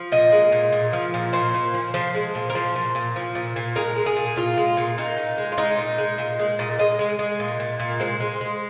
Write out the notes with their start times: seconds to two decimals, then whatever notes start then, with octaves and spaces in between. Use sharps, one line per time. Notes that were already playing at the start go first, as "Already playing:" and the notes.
Already playing: F3
0.12 A#2 D#5
0.32 G#3
0.52 A#2
0.73 A#2
0.93 F3
1.14 A#2
1.33 A#2 C5
1.54 A#2
1.74 F3
1.94 F3 C5
2.15 G#3
2.35 A#2
2.50 A#4
2.55 F3 C5
2.75 A#2
2.95 A#2
3.16 F3
3.35 A#2
3.56 A#2
3.76 G#3 A#4
3.96 G#3
4.06 G#4
4.17 A#2
4.36 A#2 F4
4.57 G#3
4.77 A#2
4.98 A#2 D#4
5.17 A#2
5.38 G#3
5.52 F4
5.58 G#3 D#4
5.78 A#2
5.98 G#3
6.18 A#2
6.39 G#3
6.59 A#2
6.79 G#3 D#5
6.99 G#3
7.19 G#3
7.40 A#2
7.60 A#2
7.80 A#2
8.00 G#3 C5
8.20 G#3
8.41 G#3